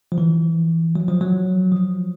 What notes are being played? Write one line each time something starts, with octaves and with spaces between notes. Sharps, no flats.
F3
E3
F#3
F3
F#3
F3